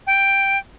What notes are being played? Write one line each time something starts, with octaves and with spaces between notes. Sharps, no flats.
G5